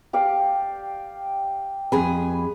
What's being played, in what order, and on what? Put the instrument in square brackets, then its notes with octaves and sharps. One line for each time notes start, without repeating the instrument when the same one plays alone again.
[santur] G4 D5 F5
[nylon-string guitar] F2 G#4 G#5 [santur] B5